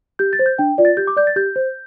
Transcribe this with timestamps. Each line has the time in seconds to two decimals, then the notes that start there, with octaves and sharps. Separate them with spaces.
0.19 G4 G6
0.33 A6
0.39 C5
0.46 G6
0.59 D4 G5
0.78 F4 D5
0.85 A6
0.97 G4 G6
1.07 D6
1.17 D5 G6
1.27 A6
1.36 G4 G6
1.56 C5